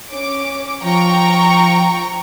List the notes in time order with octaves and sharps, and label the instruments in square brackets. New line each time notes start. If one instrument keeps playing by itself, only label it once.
[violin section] C#4 D6
[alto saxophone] F3 [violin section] G5 A#5 C#6